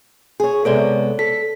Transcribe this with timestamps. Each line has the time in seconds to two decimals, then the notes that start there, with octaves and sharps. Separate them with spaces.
0.40 G#4 C#5
0.65 C3 G#3 B3 A4 C#5 D5
1.19 A4 B6